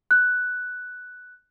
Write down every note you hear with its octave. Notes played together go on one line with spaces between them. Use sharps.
F#6